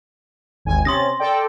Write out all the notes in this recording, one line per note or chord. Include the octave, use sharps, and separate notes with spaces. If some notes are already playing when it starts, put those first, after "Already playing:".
G#1 D#2 G#5
C3 C#4 C6 D#6 A6 A#6
A4 D5 G5